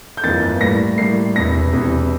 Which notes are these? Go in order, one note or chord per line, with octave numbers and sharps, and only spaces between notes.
G6
G1 F2 E3 A#3 F4 A6
A2 G3 A#3 A#6
A2 G3 A#3 C7
E1 E2 C3 A#6
E1 E2 C3